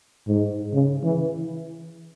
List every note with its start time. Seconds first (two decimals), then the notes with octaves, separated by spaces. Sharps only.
0.27 G#2
0.72 C#3
1.03 E3